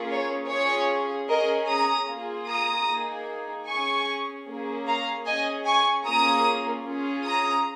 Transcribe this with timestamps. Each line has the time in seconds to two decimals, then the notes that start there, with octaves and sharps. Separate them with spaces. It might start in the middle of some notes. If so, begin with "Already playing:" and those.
Already playing: A#3 C#4 F4 G#4
0.09 C#5
0.49 C#4 F4 G#4 C#5
1.28 C#4 G#4 A#4 D#5
1.68 A#5 D#6
2.08 A#3 F4 G#4
2.48 A#5 D#6
2.88 A#3 D#4 G#4
3.67 C#4 G#4 G#5 C#6
4.47 A#3 C#4 G#4
4.87 F5 A#5
5.26 C#4 G#4 D#5 G#5
5.66 G#5 C#6
6.06 A#3 C#4 F4 G#4 A#5 D#6
6.85 C#4 F4 G#4
7.25 A#5 D#6